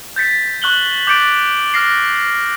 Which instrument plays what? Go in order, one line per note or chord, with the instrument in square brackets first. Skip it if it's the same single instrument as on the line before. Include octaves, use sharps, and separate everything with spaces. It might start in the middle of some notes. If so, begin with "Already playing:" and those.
[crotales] G6 A6 B6 C#7
C#6 F#6 F#7 G7
D6 G6 A6 C#7 D7
F6 A#6 C7